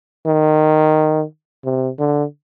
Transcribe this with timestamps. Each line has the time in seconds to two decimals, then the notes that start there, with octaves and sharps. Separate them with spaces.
0.26 D#3
1.65 C3
1.99 D3